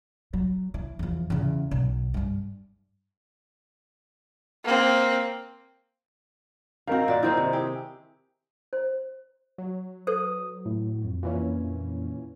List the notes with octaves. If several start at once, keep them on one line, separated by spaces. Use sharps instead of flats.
F#3
E3
E2 F3
E2 C#3
B1
G2 G3
A#3 C4
D#3 C4 F#4 A#4 F5
A#2 F#4 D5
D#3 C4 D#4 E4
C3
G4 G#4
C5
F#3
A4 B4 C5 D#6
A2
F2
A#2 E3 C#4